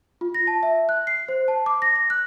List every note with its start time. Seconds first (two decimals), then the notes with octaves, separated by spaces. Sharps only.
0.21 F4
0.34 A#6
0.47 A5
0.63 E5
0.89 F#6
1.07 C7
1.29 C5
1.48 A5
1.66 D6
1.82 A#6
1.96 A#6
2.10 F#6